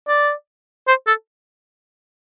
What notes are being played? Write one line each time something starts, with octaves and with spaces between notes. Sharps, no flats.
D5
C5
A4